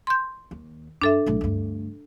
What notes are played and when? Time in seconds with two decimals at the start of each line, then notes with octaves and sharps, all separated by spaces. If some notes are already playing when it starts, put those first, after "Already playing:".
0.07 C6 G6
0.51 D#2
1.02 G2 D4 A4 E5
1.26 B1 A2
1.41 D2 G2